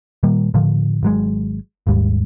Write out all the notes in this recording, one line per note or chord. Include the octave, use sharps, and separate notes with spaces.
A#2 D#3 G3 A#3
A2 D3 F3
G#1 F#3 G#3
G#1 D#2 G#2 G3